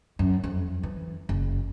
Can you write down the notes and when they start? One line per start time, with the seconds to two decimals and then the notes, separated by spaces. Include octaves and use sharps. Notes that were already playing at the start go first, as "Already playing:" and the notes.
0.19 F#2
0.44 F2
0.83 E3
1.29 F#1